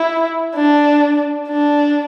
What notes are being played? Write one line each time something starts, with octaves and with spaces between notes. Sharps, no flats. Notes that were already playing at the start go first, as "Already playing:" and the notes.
Already playing: E4
D4
D4